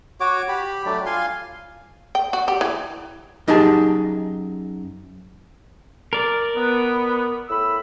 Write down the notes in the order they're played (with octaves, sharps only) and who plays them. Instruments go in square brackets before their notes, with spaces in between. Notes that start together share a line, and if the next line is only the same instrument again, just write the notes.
[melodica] F#4 C#5 D6
G4 B5
F#3 A3 D4 D5
F4 F5 G#5 C6
[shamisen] G5
F#4
G4
E3
[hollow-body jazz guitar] F#2 D#4 G4 G#4 A5
[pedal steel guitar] A#4 D5
[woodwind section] B3
A2 B5 E6